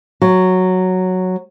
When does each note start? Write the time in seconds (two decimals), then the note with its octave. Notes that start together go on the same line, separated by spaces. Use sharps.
0.22 F#3